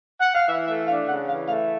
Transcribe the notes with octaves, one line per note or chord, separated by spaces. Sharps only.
F#5
F5
E3 E5
A3 E5
D4 F5
C#3 F#5
E3 F5
A3 F5